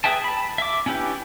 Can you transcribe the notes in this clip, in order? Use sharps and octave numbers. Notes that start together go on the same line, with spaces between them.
G#4 B4 E5 G5 A5
A5 B5
E5 D6
C#4 D4 E4 G4 B4